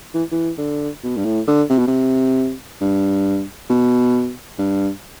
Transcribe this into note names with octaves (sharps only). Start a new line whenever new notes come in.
E3
E3
D3
B2
G2
A2
D3
C3
B2
C3
G2
B2
G2